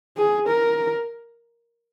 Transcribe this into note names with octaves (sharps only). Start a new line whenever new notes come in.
G#4
A#4